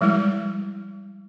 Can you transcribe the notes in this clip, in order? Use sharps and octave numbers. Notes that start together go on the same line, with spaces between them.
F3 G3 G#3 E4